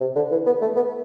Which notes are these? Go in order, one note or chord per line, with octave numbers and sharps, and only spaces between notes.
C3
D3
E3
B3
A3
B3